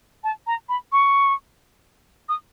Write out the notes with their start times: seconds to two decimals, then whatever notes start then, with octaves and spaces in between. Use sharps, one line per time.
0.24 A5
0.47 A#5
0.69 B5
0.92 C#6
2.29 D#6